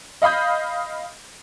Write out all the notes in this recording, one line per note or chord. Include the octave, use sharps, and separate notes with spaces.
D#5 F5 B5 D#6 G6